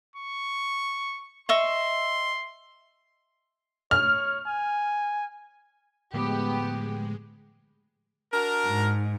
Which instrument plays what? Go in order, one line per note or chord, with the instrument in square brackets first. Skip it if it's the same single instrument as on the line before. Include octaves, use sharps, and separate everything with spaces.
[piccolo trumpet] C#6
[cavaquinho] D#5 E5 C#6 [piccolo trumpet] C6
[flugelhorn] C#5 [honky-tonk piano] F6
[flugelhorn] G#5
[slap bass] A2 D3 F3 [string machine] G#3 [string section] B3 G4
[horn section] D4 F#4 A#4
[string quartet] G#2